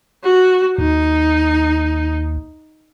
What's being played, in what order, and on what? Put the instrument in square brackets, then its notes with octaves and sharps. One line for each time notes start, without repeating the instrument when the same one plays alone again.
[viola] F#4
[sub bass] D#2 [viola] D#4